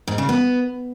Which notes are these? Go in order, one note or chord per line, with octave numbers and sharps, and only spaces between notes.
G#2
C#3
B3